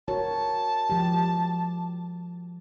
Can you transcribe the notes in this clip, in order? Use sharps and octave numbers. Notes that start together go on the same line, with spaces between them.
F#4 A#4 C#5 A5
F3 G#3 G4